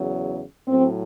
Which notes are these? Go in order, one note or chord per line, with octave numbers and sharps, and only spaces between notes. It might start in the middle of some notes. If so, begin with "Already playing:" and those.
Already playing: E2 C#3 F#3
A2 F#3 C4